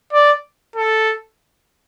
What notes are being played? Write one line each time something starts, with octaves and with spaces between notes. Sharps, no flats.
D5
A4